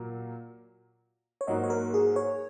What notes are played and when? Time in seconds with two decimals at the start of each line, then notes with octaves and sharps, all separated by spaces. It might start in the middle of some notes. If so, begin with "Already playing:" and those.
Already playing: A#2 F#3 A#3
1.41 C#5
1.47 G#2 F#3 A#3 F#4 D#5
1.64 C#5
1.70 A#4
1.94 G#4
2.16 C#5